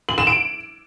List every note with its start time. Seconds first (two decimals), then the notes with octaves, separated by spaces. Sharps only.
0.09 F#7
0.18 E7
0.27 D7